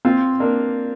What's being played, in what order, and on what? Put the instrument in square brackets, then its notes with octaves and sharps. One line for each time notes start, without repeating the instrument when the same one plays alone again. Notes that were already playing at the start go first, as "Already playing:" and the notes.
[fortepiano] C4 F4
A#3 D4